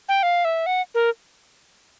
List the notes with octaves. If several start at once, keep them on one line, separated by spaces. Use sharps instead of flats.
G5
F5
E5
F#5
A#4